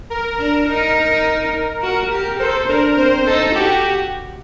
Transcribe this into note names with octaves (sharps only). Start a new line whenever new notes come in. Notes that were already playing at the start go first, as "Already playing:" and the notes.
A#4
D4 A#4
D#4
F#4 A#4
G4
A4 C5
D4 A#4
C4 C5
D#4 A4
F#4 G4